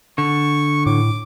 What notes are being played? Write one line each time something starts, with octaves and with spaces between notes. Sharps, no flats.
D3 C#6
A2 D6